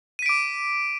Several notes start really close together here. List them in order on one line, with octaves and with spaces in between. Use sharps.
D#7 B6 D7 D6